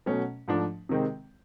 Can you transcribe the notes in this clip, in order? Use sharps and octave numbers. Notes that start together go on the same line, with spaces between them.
B2 F#3 A3 C#4
G#2 F3 A3 D4
C3 D#3 G#3 C4